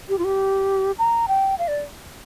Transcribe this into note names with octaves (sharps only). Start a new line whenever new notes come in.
G4
F4
G4
A#5
G5
F5
D5